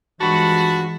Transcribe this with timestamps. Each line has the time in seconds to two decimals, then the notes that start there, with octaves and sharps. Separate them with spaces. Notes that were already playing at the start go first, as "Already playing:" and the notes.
0.21 G2 E3 F3 G#3 F#4 A5 B5